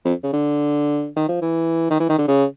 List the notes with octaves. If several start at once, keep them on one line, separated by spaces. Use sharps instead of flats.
F2
C#3
D3
D#3
F3
E3
D#3
E3
D#3
D3
C#3